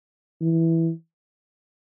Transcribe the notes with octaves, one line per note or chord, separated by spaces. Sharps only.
E3